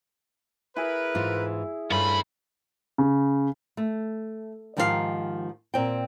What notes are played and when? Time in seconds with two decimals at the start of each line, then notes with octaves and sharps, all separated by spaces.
0.76 E4 G#4 A#4 B4
1.15 G#2 E3 F4
1.90 G2 D#3 A3 C#4 F4 B5
2.98 C#3
3.77 A3
4.77 G#2 D#3 F3 G4 G#4 F5
5.74 A#2 C4 G5